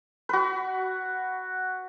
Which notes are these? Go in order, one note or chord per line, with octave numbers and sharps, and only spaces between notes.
F#4 B4